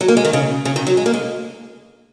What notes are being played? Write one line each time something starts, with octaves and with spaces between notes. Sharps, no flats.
F#3
A#3
G#3
D#3
C#3
C#3
D#3
F#3
G#3
A#3
G#3